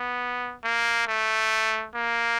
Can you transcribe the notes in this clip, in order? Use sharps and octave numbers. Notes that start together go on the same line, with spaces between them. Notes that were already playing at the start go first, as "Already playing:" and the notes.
Already playing: B3
A#3
A3
A#3